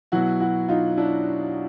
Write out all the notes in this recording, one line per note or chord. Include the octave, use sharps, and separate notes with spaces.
B2 F#3 E4 F#4
E4 F#4
D#4 F4
D4 E4